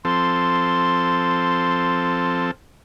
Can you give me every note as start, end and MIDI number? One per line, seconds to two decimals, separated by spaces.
0.05 2.51 53
0.05 2.51 60
0.05 2.51 69
0.05 2.44 84